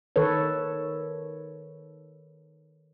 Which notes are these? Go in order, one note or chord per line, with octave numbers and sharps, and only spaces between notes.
D#3 A4 B4 C#5